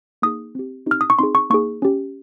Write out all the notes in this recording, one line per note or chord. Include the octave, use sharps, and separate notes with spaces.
A#3 D#4 G#4 D#6
C4 G4
C4 D#4 G4 F6
D#6
C#6
C4 D#4 G#4 C6
C#6
A#3 D#4 G#4 C#6
C#4 G4